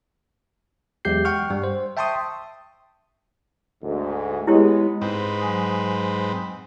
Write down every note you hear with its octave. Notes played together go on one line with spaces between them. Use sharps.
E2 F#3 G#3 G4 G6 C7
F#5 G5 C#6 F6
G2 G3
C5
E5 G5 A5 C6 C#6 D#6
D2 G#2
G#3 B3 E4 G4 C#5
G#2 C4 B4
F#3 G#5 D#6